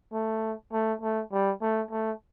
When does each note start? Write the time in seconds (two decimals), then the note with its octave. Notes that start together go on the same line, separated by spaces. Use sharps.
0.13 A3
0.72 A3
1.02 A3
1.32 G3
1.61 A3
1.91 A3